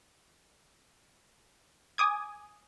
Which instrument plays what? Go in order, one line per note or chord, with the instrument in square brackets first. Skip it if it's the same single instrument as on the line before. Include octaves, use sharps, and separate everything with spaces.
[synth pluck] G#5 D6 D#6 G#6